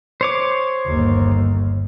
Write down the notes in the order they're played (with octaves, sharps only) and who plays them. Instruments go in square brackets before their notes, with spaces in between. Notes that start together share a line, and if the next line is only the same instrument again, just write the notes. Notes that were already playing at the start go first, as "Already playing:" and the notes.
[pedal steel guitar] C5 C#5 D6
[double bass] G1 D#2